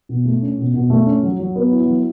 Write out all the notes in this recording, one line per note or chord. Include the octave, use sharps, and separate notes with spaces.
B2
A3
C#4
B2
B2
A3
C#4
F#3
F#3
B3
E4
F#3